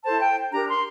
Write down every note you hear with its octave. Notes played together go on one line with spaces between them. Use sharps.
E4 A4 C5 A5
G5
D4 G4 A#4 A#5
C6